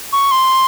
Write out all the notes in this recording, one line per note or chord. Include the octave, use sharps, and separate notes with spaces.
C#6
C6